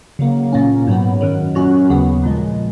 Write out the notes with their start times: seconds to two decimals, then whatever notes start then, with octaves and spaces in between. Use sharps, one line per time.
0.19 C#3 F#3 A#3
0.53 A#2 A#3 C#4
0.87 G#2 F#3 B3
1.21 F#2 D#3 F#3
1.55 A#2 F#3 C#4 F#4
1.90 D#2 C#3 F#3 B3
2.23 A#1 A#2 G#3